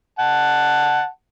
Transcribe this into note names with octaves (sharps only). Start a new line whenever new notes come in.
F#5 A5